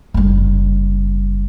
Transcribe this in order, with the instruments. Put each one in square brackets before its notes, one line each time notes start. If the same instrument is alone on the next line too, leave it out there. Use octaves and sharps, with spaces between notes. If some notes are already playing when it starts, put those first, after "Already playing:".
[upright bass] F#1 G3